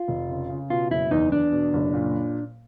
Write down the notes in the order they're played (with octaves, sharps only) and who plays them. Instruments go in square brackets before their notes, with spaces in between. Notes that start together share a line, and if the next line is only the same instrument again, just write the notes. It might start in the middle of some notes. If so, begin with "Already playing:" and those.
Already playing: [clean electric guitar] F4
[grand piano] F1
C#3
C#3
[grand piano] B2 [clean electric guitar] F4
[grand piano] F#1 [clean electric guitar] E4
[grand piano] E2 [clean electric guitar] D#4
[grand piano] E2 [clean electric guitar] D4
[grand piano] B2
F#1
A#2